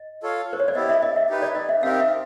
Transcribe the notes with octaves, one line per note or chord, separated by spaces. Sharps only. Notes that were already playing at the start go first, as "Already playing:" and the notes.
Already playing: D#5
F4 A4 C#5 F5
C5
C#5
D5
B3 E4 G4 D#5
E5
D#5
E5
D#4 G4 B4
D5
D#5
E5
C4 D#4 G4 A#4 F5
E5